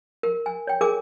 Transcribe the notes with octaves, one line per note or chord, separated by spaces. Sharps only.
A#4
G#5
C#5 G5
G#4 A#4 G#5 D6